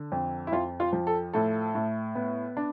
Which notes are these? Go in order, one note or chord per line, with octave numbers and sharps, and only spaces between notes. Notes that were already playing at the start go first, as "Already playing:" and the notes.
Already playing: D3
F2
E4
F2 F4
F4
F3
A4
A2 A4
A2
B3
D4